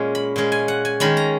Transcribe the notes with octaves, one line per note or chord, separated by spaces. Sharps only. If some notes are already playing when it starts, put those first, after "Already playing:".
Already playing: A#2 G#3 C#4
B5
A#2 G#3 C#4
G#5
F#5
G#5
D#3 G#3 C#4 B5
A#5